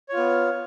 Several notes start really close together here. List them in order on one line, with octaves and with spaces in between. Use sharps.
C#5 F4 B3